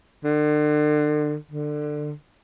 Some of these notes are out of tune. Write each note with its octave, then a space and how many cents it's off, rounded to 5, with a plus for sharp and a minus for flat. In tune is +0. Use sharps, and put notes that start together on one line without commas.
D3 +35
D3 +20